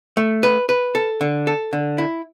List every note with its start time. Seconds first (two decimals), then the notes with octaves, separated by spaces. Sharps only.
0.17 A3
0.43 B4
0.69 B4
0.95 A4
1.21 D3
1.47 A4
1.73 D3
1.98 E4